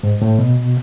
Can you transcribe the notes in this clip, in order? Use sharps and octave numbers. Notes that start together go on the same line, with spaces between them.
G#2
A2
B2